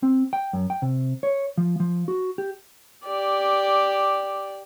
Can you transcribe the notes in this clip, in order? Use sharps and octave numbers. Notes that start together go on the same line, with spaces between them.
C4
G5
F#2
G5
C3
C#5
F3
F3
F#4
G4
G4 D5